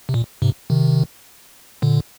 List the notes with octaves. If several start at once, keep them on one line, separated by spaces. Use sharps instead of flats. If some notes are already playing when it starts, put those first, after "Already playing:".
C3
A#2
G#2 C3
C3 D#3
A#2 D3